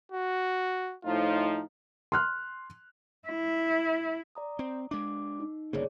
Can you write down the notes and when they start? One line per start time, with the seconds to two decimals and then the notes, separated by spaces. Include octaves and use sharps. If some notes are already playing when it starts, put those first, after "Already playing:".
0.12 F#4
1.05 A2 F3 D#4 F4
2.12 C6 F6 F#6
3.28 E4
4.35 D5 A#5 D#6
4.59 C4
4.91 G#3 D4 D6
5.40 D#4
5.73 G1 C#3 A#3 G#4 C#5 D5